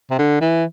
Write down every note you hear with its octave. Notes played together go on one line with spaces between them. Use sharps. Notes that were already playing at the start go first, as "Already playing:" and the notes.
C3
D3
E3